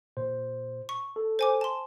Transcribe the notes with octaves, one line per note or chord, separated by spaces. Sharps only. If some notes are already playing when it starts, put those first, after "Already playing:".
A#2 C5
C#6
A4
C5 G#5 D6
A5 C6